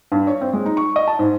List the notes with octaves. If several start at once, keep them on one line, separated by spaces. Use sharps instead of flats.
G2
C#5
C4
G#3
D#4
C#6
D#5
A5
G#2